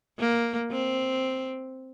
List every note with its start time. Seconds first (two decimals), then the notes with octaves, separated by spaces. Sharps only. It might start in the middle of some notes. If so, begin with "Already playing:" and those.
0.19 A#3
0.71 C4